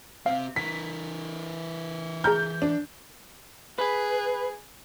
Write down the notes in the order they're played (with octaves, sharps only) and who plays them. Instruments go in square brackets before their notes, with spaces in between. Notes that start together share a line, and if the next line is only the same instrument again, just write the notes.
[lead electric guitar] C3 C4 [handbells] F5
[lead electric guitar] E3 A#4 [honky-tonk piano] B6
[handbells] G#4 A#5 F6 [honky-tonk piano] G6
[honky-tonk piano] D4
[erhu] G#4 [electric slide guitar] B4